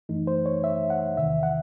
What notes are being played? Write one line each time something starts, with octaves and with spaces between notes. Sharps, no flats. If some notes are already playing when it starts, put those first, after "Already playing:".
F#2 E3 A3 D#4
C5
C#5
E5
F#5
E2 C3 D#3 E5
F#5